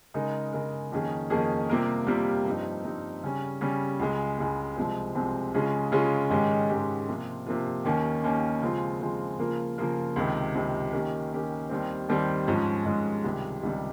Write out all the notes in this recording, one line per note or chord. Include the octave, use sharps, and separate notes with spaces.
C#3 G#3 D#4 A#4
C#3 G#3 D#4 A#4
F2 D#3 A#3 C#4 G#4
F2 D#3 A#3 C#4 G#4
C3 G3 A#3 F4 A#4
C3 G3 A#3 F4 A#4
G2 F3 C4 D#4
G2 F3 C4 D#4
C#3 G3 C#4
C#3 G3 C#4
C#2 C#3 G#3
C#2 C#3 G#3
C2 C3 F3 G#3 C4
C2 C3 F3 G#3 C4
C#3 G#3 C#4 F4 G#4
C#3 G#3 C#4 F4 G#4
G#2 D#3 G#3 C#4 G4
G#2 D#3 G#3 C#4 G4
C3 F3 A#3 F4
C3 F3 A#3 F4
D#2 D#3 A#3 C#4
D#2 D#3 A#3 C#4
C#3 F3 G#3 C4 F4
C#3 F3 G#3 C4 F4
C#3 F3 A#3 F4 A#4
C#3 F3 A#3 F4 A#4
C#2 C3 D#3
C#2 C3 D#3
D#3 A#3 C#4 G4 A#4
D#3 A#3 C#4 G4 A#4
D#2 D#3 G3 C4
D#2 D#3 G3 C4
G#2 F3 G#3 C#4
G#2 F3 G#3 C#4
C#2 C3 D#3 G3
C#2 C3 D#3 G3